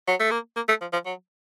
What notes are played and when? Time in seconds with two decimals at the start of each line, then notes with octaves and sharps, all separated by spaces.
0.07 F#3
0.20 A3
0.31 A#3
0.56 A#3
0.68 A3
0.81 F3
0.92 F3
1.06 F#3